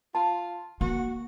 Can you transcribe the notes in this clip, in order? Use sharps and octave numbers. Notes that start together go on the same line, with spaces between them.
F4 A5
A#3 F#4